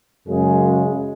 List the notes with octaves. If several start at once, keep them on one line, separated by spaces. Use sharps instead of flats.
F#2 C#3 G#3 G#4